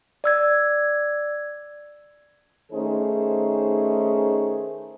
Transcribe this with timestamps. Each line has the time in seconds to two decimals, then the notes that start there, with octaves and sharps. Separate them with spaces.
0.24 D5 E6 G#6
2.72 D#3 A3 C#4 D#4 G#4 C5